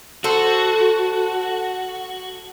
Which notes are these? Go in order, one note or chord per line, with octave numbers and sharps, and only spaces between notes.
F#4 A4 C5